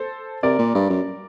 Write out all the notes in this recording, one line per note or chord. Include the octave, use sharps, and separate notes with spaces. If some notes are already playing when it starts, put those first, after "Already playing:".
Already playing: A4 C5
C3 A#4 D5
A#2
G2
F#2